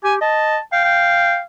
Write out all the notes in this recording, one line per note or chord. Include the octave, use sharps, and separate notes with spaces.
G4 G#5
D#5 A5
F5 G5
G5